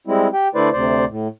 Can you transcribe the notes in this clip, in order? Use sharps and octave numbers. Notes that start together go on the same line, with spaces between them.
G3 G#3 C4 E4
G4 G5
D3 A3 E4 B4 C5 D5
D2 C3 C5 D5
A2